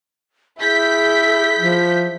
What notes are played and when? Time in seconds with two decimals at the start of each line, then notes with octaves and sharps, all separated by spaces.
0.60 E4 G#4 G6 B6
1.59 F3